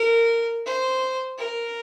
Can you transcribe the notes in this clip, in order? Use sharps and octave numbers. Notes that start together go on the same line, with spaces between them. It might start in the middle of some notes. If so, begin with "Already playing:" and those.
Already playing: A#4
C5
A#4